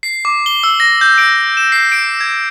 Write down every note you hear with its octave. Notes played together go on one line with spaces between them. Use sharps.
C7
D6
G7
E6
A#6
G6
D7
E7
C7
D7
G#6